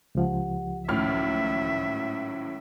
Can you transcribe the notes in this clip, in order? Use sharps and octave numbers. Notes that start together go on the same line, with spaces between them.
C#2 F3 G4 F#5
G#1 A2 F#3 C#4 E5 F6